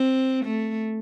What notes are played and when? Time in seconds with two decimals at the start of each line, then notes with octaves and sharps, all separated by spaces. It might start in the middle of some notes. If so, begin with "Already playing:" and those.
Already playing: C4
0.45 A3